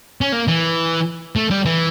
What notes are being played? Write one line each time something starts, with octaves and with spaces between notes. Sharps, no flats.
C#4
A#3
E3
A3
G3
E3